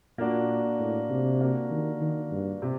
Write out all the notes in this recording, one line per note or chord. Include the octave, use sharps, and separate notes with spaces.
A#2 A#3 D4 F#4
A2
C3
A#3 D4 F#4
D#3
D#3
G2
C3